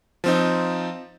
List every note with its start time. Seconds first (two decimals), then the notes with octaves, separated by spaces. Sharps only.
0.24 F3 C4 D#4